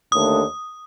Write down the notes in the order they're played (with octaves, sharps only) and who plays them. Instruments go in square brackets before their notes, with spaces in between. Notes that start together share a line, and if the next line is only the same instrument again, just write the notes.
[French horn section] D#2 D3 A3 [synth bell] D#6